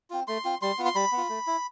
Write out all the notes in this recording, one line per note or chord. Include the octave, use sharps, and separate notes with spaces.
C4 F4
A3 C6
C4 F4
G3 C6
B3 F4
C6
G3 B5
B3
F4
A3
E4